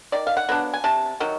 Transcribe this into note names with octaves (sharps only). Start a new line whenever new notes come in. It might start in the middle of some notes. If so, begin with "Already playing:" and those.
D#3 D5
F5
F#5
F#3 B3 D4
G#5
C3 A5
D#3 F#3